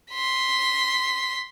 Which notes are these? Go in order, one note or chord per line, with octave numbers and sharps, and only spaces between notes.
C6 B6